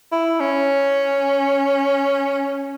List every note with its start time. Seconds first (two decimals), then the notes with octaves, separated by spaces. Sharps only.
0.12 E4
0.40 C#4